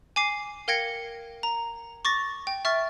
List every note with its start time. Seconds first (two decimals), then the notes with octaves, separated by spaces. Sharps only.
0.16 G#5 D6 C7
0.68 A#4 F5 G5 G#6 A#6 C#7
1.43 A#5
2.05 C#6 D6 A6 A#6
2.47 G5
2.65 E5 C#6 F6 A6